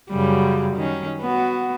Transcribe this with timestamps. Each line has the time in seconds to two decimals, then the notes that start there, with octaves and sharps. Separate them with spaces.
0.11 F#2 C#3 G3
0.75 D#3 C#4
1.21 B3 F#4